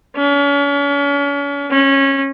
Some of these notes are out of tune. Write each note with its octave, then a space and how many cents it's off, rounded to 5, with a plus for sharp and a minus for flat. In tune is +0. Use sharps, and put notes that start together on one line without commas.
C#4 +40
C#4 -20